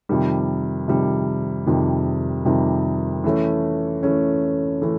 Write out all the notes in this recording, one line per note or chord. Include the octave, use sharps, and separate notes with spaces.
F2 C3 D#3 G3
F2 C3 D#3 G3
F2 C3 D#3 G3
F2 C3 D#3 G3
E3 A3 C#4
E3 A3 C#4
E3 A3 C#4